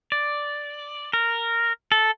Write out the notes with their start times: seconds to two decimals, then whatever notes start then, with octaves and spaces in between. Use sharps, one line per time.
0.12 D5
1.13 A#4
1.92 A4